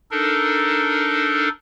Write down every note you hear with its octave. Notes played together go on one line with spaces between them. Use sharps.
D4 D#4 A4 A#4